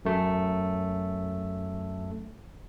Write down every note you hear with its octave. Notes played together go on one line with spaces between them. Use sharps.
F#2 A3